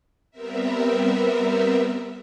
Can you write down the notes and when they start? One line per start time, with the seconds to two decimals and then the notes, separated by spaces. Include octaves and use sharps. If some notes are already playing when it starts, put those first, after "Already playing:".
0.31 G3 B3 C4 A#4 E5